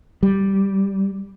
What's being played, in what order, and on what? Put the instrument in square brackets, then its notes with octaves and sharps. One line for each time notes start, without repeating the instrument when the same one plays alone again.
[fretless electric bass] G3